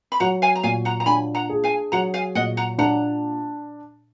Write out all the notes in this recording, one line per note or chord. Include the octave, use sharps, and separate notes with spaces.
B5
F#3 F#5 A#5
F5 G#5
A#5
A#2 F5 G#5
F#5 A#5
A#5
D4 G#5 B5
F#5 A#5
G#4
F5 G#5
F#3 F#5 A#5
F5 G#5
A#2 D#5 F#5
F#5 A#5
D4 F#5 A#5